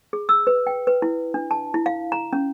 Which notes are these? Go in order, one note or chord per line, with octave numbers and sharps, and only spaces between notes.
G#4
E6
B4
G5
B4
E4
D4
A5
E4
F5
A#5
C#4